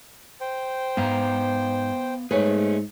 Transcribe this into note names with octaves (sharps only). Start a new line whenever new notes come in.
C5 G5
G#2 B3 F5
G#2 A3 G#4 B4 C#5